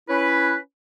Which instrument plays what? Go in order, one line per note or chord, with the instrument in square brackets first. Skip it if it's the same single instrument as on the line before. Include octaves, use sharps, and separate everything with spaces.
[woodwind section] C#4 E4 B4